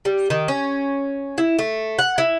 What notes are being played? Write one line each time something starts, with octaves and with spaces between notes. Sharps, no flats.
G3
D#3
C#4
E4
A3
F#5
E4